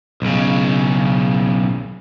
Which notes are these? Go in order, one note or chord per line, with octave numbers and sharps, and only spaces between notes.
B1 C#3